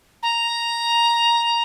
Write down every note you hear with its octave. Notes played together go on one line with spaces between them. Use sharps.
A#5